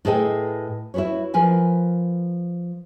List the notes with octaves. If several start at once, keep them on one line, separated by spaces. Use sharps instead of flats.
A2 G#4 A4 B4 D#5 G5
E4 F#4 G#4 B4 C#5
F3 A#4 B4 G#5